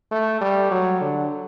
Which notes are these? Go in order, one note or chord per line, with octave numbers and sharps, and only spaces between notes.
A3
G3
F#3
D3